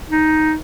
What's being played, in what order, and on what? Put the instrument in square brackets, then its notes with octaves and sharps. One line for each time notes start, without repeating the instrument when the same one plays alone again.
[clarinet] D#4